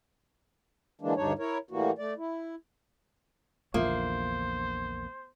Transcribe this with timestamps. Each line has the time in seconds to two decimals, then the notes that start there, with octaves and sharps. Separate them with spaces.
1.01 D3 E3 G#3 A#3 D4
1.16 D2 G2 G3 D4 D#4 C#5
1.39 E4 A#4 C#5
1.71 A2 E3 G3 A#3 F#4
1.99 A3 D5
2.18 E4
3.74 A#1 E2 D3 A#3 F4 C5 E5